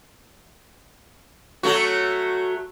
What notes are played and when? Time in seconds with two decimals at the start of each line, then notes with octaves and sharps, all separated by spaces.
1.63 F#3 A3 F#4